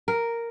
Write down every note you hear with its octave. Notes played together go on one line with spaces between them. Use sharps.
A#4